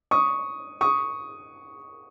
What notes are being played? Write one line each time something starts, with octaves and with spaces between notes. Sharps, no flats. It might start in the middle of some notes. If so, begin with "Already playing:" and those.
C#6 D#6
C#6 D#6